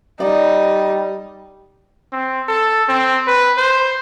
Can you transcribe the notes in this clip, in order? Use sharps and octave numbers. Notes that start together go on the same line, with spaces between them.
G3 D#4 D5
C4
A4
C4
B4
C5